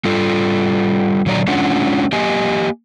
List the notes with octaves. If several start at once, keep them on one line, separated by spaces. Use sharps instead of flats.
G3 F4 A4
A#2 D3 F#3 C#5 D5 A#5
G#3 C#4 D4 F4 C#5 F#5
A#3 G4 D#5 G#5